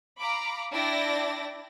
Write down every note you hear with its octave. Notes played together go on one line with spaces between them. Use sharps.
F5 A#5 B5 D6
D4 E4 D5 G5 A6 A#6